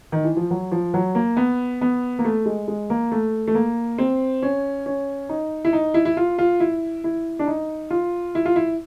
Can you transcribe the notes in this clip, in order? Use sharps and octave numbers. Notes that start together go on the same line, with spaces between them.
D#3
E3
F3
F#3
F3
F#3
A#3
B3
B3
A#3
A3
G#3
G#3
A#3
A3
A3
A#3
C4
C#4
C#4
D#4
E4
D#4
E4
E4
F4
F4
E4
E4
D4
D#4
F4
E4
F4
E4